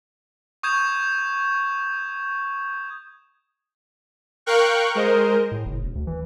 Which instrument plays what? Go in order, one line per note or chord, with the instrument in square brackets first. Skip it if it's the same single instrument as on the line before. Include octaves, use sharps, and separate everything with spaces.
[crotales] C#6 D#6 G6 G#6 E7
[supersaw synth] A#4 F5 G5 C#6 F#6
G#3 A#4 C5 D#5
[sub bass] A2
F#1
E1
D2
E3